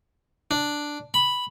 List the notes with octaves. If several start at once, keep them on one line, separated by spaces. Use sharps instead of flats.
D4
B5